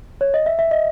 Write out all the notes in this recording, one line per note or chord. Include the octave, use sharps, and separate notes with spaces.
C#5
D#5
E5
E5
D#5